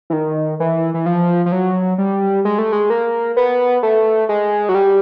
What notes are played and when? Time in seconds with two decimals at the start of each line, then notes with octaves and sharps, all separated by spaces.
0.10 E3
0.13 D#3
0.60 E3
0.94 E3
1.06 F3
1.46 F3
1.52 F#3
1.98 G3
2.45 G#3
2.58 A3
2.72 G#3
2.90 A#3
3.37 B3
3.83 A3
4.29 G#3
4.69 F#3
4.75 G3